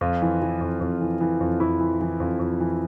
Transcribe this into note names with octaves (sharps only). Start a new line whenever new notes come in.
F2 F4
E3
E3
F2
F2
E3
E3
F2
F2 E4
E3
E3
F2
F2
E3